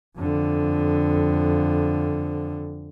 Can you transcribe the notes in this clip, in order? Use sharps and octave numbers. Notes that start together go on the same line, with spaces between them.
F2 D3